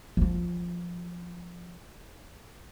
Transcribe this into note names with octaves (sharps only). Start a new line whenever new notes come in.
F3 F4